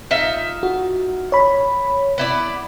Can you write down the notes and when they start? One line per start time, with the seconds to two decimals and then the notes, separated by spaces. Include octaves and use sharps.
0.11 D#4 F4 E5
0.63 F#4
1.32 C#5 B5
2.18 B3 E4 D5